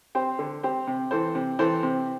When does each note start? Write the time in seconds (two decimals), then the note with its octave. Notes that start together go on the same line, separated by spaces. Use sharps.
0.15 C4 G4 C5
0.39 D3
0.63 C4 G4 C5
0.87 C3
1.11 E3 C4 A4 C5
1.35 C3
1.59 E3 C4 A4 C5
1.83 C3